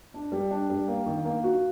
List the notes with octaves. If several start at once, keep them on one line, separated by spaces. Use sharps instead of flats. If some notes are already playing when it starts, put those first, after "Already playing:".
D4
G3
D4
G3
A#3
D#3
A#3
F#4